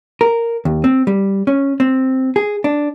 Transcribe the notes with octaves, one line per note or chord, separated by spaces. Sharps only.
A#4
D#2
C4
G3
C#4
C4
G#4
D4